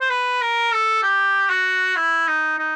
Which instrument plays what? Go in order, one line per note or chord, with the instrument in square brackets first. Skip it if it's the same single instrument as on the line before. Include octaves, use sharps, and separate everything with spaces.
[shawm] C5
B4
A#4
A4
G4
F#4
E4
D#4
D#4